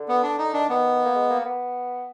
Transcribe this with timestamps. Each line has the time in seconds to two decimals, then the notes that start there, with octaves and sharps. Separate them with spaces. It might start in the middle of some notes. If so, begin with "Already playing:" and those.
Already playing: D3
0.08 B3
0.23 D4
0.38 D#4
0.53 D#3 D4
0.69 D#3 B3
1.05 A#3
1.15 G#3
1.30 A#3
1.45 B3